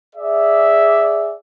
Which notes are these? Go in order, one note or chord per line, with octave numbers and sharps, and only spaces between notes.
G#4 D5 E5